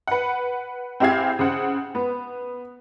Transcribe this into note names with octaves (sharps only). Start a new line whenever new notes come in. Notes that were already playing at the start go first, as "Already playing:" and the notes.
B4 F#5
C4 E4 G4 G#4 F5 G#6
C#3 C5 F#5
B3